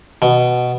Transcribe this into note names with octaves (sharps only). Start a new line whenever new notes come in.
B2